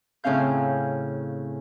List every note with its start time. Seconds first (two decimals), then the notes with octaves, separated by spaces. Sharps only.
0.24 A2 C#3 C4 C#4 F5 G6